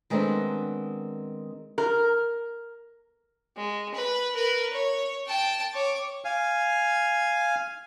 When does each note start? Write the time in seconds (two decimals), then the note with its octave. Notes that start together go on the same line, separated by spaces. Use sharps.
0.10 D#3 G#3 A3 B3 C4 D4
1.78 A#4
3.57 G#3
3.94 B4
4.32 A#4 B4
4.73 C#5
5.27 G5 A5
5.74 C#5 D6
6.25 F5 G#5